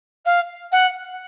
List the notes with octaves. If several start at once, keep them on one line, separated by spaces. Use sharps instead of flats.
F5
F#5